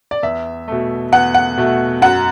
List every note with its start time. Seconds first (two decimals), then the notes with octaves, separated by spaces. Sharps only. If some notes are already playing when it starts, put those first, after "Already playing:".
0.11 D5
0.23 E2 E5
0.68 B2 A3
1.12 E2 F#5
1.34 F#5
1.57 B2 A3
2.02 F#2 F#5